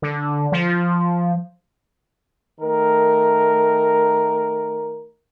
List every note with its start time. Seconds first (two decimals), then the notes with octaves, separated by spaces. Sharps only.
0.02 D3
0.52 F3
2.61 D#3 A3 A#4